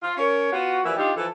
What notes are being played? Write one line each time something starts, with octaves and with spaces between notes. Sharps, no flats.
F4
C#4 A#4 C#5
B3 F4 F#4
E3 F3 G3 A#3 E5
D4 D#4 F4 G4
E3 F3 A4